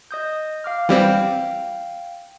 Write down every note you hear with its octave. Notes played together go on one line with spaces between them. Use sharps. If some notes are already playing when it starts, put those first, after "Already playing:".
D#5 D#6 G6
F5 D6 F6
E3 G3 C4 F5 G5